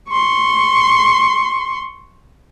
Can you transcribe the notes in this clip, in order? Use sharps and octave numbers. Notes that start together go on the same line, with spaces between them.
C6 C#6